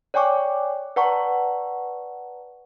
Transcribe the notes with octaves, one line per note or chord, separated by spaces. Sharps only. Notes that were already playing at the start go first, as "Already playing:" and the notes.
C#5 D5 G5 G#5 C#6 D6
B4 D5 F#5 A5 A#5 C#6